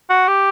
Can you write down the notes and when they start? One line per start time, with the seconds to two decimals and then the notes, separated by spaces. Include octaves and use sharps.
0.10 F#4
0.28 G4